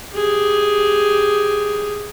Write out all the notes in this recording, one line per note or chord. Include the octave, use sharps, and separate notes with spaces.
G4 G#4